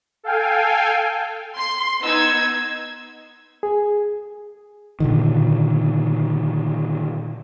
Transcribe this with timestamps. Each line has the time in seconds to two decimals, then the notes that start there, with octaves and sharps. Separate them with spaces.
0.23 A4 F5 G5 G#5
1.57 C6
2.01 B3 D#4 E6 G#6
3.63 G#4
5.00 A#2 D3 D#3